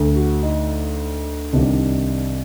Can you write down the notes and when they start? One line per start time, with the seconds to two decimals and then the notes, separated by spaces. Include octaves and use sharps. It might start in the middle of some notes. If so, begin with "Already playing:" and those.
Already playing: D2 D3
0.16 F#4
0.43 D#4
1.53 C2 C3 D#3 D4